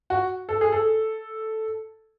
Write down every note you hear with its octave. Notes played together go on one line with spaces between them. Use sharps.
F#4
A4
G#4
A4